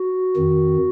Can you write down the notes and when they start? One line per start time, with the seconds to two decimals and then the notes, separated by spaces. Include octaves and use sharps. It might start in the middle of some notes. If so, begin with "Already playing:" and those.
Already playing: F#4
0.36 F2 D#3